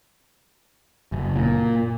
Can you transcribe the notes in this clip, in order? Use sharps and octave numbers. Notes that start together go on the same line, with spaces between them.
F#1
A#2